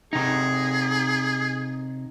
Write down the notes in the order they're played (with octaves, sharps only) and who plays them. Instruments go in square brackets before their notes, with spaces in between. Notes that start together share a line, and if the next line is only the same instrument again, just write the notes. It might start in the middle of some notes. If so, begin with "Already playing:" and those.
[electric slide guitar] C3 D#4 [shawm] G#4